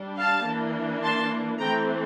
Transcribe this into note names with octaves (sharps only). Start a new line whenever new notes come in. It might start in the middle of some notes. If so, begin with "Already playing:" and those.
Already playing: G3 D4
F5 A5
E3 A#3 D4
A5 C6
E3 A3 C4 G5 A#5